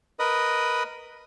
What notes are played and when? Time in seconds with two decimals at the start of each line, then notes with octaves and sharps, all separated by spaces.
0.19 A#4 B4 D#5 B5 D#6